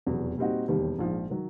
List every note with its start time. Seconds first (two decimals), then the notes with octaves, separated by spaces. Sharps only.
0.06 F1 E2 B2 F#3
0.38 A#2 G3 C4 D#4 F#4
0.68 E1 D#2 D#3 G3
0.99 A#1 G#2 F3
1.30 D#3 F#3